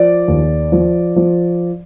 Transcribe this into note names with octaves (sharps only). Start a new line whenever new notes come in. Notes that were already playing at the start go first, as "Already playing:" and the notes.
Already playing: F3 D5
D#2
F3
F3